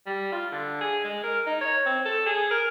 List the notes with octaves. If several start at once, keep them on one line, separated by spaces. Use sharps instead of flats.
G3
F4
D3
G#4
G#3
A#4
D#4
C#5
C4
A4
G#4
A#4